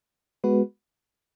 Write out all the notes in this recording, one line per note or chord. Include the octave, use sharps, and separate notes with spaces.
G#3 B3 F#4 B4